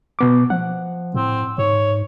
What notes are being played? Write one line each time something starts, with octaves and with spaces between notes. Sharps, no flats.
B2 B3 D6
F3 F#5
A2 C4
G#2 C#5